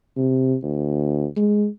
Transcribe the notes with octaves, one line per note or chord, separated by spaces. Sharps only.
C3
D2
G#3